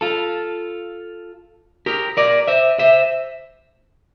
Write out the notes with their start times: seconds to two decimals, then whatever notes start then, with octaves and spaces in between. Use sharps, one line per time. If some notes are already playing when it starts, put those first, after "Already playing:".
0.01 F4 A4
1.86 G4 A#4
2.17 A#4 D5
2.47 C5 E5
2.79 C5 E5